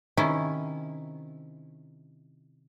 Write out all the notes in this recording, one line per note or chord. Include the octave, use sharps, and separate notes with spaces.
C3 D#3 C#4 E4